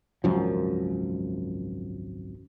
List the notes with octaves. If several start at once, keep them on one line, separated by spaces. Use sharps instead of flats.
G#1 C#2 F#2 F3